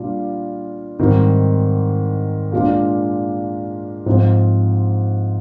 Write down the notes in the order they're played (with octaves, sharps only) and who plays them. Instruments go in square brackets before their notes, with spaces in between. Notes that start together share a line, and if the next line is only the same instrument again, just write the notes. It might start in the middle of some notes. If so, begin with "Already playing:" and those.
Already playing: [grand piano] A#2 G3 D4 F4
G#2 D#3 G3 C4
A#2 G#3 D4 F4
G#2 F3 C4